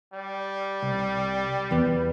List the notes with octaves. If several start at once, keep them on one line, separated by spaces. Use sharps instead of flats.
G3
C2
E2 B3